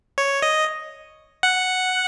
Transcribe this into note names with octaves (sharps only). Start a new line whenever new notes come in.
C#5
D#5
F#5